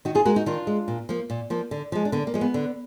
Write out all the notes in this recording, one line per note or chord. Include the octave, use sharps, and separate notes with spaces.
D#3 D#4 F#4
F4 G#4
G#3 F#4 A#4
D#4 F#4
D#3 D4 F4
G#3
A#2
F3 A#3
A#2
F3 A#3
D3
F3 G#3
D4
D3 B3
A#3
F3 G#3
B3
D3